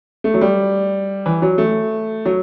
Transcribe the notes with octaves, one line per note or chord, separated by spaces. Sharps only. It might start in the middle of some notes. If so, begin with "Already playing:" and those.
A3
F#3
G3
E3
F#3
A3
F#3